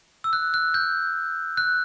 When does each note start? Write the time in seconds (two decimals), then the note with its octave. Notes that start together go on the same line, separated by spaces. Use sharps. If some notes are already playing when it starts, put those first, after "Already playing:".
0.24 E6
0.33 F#6
0.54 F#6
0.74 G6
1.57 F#6